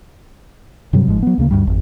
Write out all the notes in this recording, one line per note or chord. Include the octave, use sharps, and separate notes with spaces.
G2 C3 F#3 G3
G1 G#2 F3 G#3
F#3 B3
D2 C#3 A#3
D2 G2 G3
G#1 F2